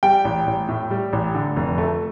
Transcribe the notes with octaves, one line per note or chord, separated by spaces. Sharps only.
G3 G5
A1
A1
A2
G3
A1
D3
F1
A3